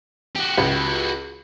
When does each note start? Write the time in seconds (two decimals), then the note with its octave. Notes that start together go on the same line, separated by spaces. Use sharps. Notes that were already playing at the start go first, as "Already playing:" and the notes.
0.35 F#4 G4
0.58 C#2